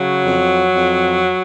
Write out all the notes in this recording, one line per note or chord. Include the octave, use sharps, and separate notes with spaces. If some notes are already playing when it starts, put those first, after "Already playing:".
Already playing: C#3 F#3
F2
F2